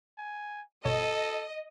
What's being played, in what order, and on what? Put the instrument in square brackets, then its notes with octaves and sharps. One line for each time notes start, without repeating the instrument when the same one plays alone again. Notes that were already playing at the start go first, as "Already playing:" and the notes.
[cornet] G#5
[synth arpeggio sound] G1 B2 C#5 [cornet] A4 [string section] D#5